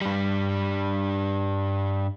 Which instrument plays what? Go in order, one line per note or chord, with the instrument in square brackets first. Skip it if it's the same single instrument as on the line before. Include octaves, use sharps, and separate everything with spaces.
[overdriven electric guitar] G2 G3